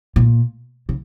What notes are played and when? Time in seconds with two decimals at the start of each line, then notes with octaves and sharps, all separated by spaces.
0.16 A#2
0.89 C#3